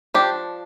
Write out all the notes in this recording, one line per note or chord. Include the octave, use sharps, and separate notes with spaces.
F3 D4 G4